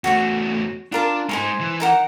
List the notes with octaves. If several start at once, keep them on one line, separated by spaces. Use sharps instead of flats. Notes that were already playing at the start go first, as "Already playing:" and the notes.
E2 A3 F#4 C#5 C#6
D4 F4 A#4 A5
G#3 D#4 C5 G#5 C6
E3
D#4 A#4 F#5